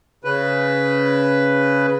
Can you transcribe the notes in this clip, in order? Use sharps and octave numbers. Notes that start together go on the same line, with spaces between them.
C#3 B4